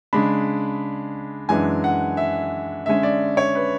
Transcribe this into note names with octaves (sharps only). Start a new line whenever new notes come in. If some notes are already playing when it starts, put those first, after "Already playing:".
C#3 G#3 D4 B5
F#2 E3 G#3 D4 G#5
F#5
E5
D3 G#3 C#4 E5
D5
C#5
B4